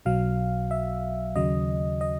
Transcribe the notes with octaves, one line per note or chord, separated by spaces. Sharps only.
B1 B2 F#3 F5
E5
D#2 C#3 F#3 D#5
D#5